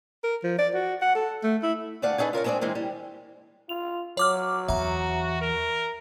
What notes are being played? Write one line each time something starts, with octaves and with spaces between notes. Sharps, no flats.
A#4
F3
D5
F#4
F#5
A4
A3
E4
D2 A3 D5 F5 F#5 G#5
C#4 D#4 G#4 A4 B4
F4 A#4 C#5 F5
G#3 B3 C4 D4 G#4 D5
E3 G#3 A#3 C4
G3
F4 F7
F#3 C#5 D6 F6
E2 F#4 E5 A#5
A#4